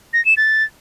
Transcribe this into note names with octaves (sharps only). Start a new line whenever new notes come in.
A#6
E7
A6